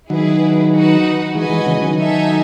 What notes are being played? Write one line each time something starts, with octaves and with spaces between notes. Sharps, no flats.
D#3 F#3 E4 G#4 B4
D#4 F#4 B4 F#5
E3 G#3 F#4 B4 D#5 G#5
E3 G#3
C#3 E3
D#3 F#3
D#4 A4 E5 G#5